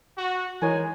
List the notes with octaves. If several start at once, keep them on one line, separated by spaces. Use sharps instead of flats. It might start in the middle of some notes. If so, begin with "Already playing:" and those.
F#4
E3 G#3 D#4 A#4 C#5 G#5